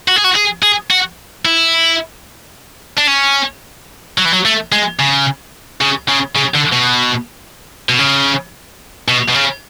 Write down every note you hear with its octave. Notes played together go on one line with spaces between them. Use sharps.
F#4
G#4
F#4
G#4
G#4
F#4
E4
D4
C#4
F#3
E3
F#3
A3
G#3
C#3
C#3
C#3
C#3
D3
B2
B2
C#3
B2
B2
C#3